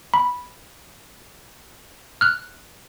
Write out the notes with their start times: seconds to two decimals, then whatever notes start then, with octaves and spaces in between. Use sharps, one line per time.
0.14 B5
2.21 F6 F#6